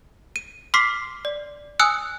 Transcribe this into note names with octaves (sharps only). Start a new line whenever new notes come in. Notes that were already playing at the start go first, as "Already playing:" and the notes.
D#7
C6 D6 F6 B6 C7
D5
G#5 D#6 E6 F#6 C#7